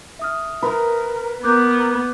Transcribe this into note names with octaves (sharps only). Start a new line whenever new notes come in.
E5 D#6 F6
A#4 B4
B3 A#4 D6 F#6 G6